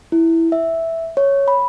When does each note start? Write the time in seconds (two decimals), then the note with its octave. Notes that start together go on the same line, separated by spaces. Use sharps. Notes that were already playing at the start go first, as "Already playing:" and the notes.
0.12 E4
0.52 E5
1.17 C#5
1.48 B5